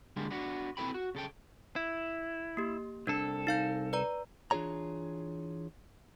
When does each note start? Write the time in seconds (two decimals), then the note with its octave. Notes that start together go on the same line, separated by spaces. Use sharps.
0.16 D3 G3 G#3 A#3
0.31 B3 D4 F#4
0.77 C4 E4 A4 B4 G5 B5
0.94 F#4
1.15 C#3 A4 G5
1.76 E4
2.57 A#3 G4
3.07 C2 D4 A4
3.47 D#4 F5 G6
3.93 B4 D5 A#5
4.51 E3 D4 F4 G#4 C#5 A#5